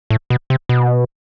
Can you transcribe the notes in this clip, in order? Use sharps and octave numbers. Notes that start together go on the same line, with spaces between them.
A2
B2
C3
B2